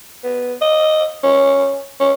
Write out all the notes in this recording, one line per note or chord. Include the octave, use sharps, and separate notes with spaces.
B3
D#5
C#4
C#4